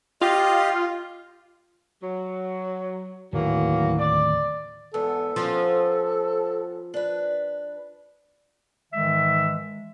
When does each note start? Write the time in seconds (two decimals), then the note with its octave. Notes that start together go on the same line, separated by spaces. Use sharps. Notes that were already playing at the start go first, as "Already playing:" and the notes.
0.21 F4 G4 D#5
2.02 F#3
3.33 D1 D#2 E3 F#3 A#3
3.98 D5
4.94 E2 G#2 B3 A4
5.36 F3 B3 C#4
6.94 D4 B4
8.93 G#2 D#3 E3 G#3 E5